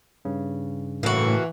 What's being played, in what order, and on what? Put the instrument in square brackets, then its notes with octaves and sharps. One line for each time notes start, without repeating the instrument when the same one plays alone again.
[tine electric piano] G2 C#3
[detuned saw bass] A2 [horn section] E3 [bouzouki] A#3 F#4